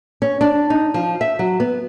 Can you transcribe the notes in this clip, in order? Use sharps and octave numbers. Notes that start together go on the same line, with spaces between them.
C#4
D4
D#4
F3
E5
F#3
B3